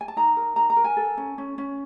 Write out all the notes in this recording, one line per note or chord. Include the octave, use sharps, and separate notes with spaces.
G#5
A5
D#4 A#5
A#4
D#4 A#5
A#5
A#4
G#5
A4
C#4
C#4
C#4